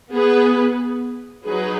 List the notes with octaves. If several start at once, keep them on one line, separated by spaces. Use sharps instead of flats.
B3 G#4 B4
F#3 D#4 G#4 B4